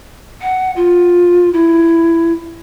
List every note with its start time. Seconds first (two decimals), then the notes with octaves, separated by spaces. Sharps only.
0.42 F#5
0.76 F4
1.53 E4